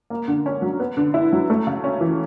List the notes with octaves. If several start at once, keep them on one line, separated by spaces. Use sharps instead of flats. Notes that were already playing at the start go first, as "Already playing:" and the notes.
A#3
D3
C#4
F#3
B3
D3
E4
F#3
A3
C#3
C#4
E3